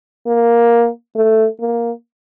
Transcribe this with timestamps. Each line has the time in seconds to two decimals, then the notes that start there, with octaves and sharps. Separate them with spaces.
0.27 A#3
1.16 A3
1.60 A#3